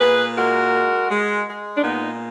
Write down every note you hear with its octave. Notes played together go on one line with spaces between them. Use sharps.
A#2 G#4 B4
G#3 F#4 A#4
G#3
G#3
G#3
D4
A#2 B3 D#4